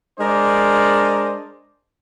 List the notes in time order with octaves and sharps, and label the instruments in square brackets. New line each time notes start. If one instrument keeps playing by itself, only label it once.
[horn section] G#3 D4 A#4 C5 D5